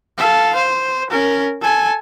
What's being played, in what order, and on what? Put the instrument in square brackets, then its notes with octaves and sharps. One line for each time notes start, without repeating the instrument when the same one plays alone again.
[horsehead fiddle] A4 F5
C5
C#4 A#4
A4 G#5